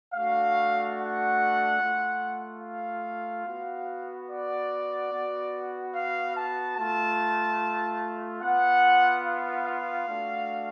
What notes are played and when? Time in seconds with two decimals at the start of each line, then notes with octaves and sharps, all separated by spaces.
0.15 A3 D4 F#4 F5
0.98 F#5
1.80 A3 F4
2.63 F5
3.46 B3 F#4
4.29 D5
5.11 B3 F#4
5.94 F5
6.35 A5
6.76 A3 F4 A5
8.42 B3 F4 F#5
9.25 F5
9.67 F5
10.07 A3 D4 F#4